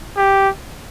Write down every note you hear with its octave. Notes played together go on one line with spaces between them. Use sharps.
G4